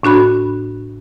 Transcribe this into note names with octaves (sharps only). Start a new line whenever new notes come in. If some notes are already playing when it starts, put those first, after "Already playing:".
A2 D4 F#4 B5